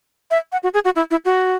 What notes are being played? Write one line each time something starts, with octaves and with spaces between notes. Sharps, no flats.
E5
F#5
F#4
G#4
F#4
E4
E4
F#4